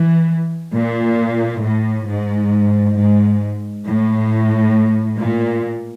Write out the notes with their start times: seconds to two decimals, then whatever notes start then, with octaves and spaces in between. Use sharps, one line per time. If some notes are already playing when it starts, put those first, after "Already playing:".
Already playing: E3
0.73 A#2
1.62 A2
2.07 G#2
2.97 G#2
3.86 A2
5.18 A#2